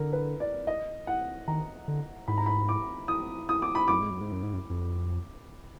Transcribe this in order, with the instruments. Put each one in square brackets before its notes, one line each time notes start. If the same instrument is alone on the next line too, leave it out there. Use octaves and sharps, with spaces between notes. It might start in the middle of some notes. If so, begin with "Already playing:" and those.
Already playing: [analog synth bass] D3 [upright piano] A#4
[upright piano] B4
D5
D#5
F#5
[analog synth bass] D#3 [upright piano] A#5
[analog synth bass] D3
[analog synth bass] G#2 [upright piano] B5
[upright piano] A#5
B5
D6
D#6
D#6
D6
B5
[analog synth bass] F#2 [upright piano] D6
[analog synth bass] G#2
F#2
G#2
F#2
G#2
F#2
F2